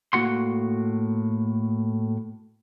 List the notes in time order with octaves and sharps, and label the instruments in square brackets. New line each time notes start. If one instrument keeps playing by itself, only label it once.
[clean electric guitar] A2 A#3 F#4 F#5 C6